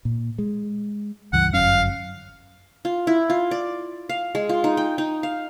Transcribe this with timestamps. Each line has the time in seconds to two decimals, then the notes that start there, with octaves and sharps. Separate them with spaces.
0.05 A#2
0.38 G#3
1.33 C#2 G2 E3 F#5
1.53 G1 F#2 C#4 F5
2.85 F4
3.07 E4
3.30 F4
3.51 D5
4.09 F5
4.35 G#3
4.49 F4
4.64 D#4
4.77 G5
4.98 D#4
5.23 F5